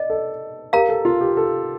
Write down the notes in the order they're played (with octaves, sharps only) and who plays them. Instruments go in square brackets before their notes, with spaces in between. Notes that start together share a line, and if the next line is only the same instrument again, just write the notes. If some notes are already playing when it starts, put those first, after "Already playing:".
Already playing: [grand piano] D5 [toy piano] D#5
[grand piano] A4
[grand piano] G4 [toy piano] A#4 F5 A#5
[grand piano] A4
F4
G4
A4